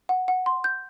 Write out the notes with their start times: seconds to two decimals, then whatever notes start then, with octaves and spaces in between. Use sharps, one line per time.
0.09 F#5
0.28 F#5
0.46 C6
0.64 G6